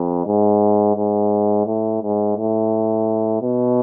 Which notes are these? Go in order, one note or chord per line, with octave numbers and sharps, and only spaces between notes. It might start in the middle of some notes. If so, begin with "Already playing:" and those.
Already playing: F2
G#2
G#2
A2
G#2
A2
B2